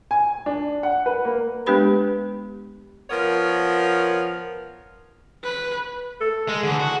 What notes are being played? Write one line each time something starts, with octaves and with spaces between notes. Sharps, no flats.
G#5
D4
F#5
B4
A#3
G#3 B3 D4 G4 B4 B5
F3 B3 A#4 C#5
B4
A4
G#3
D3 E3 G#4
F#4